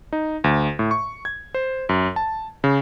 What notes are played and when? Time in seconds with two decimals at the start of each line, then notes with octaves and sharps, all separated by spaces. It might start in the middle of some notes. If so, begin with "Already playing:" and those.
0.13 D#4
0.44 D2
0.79 A2
0.91 C#6
1.25 G#6
1.54 C5
1.89 F#2
2.16 A5
2.64 C#3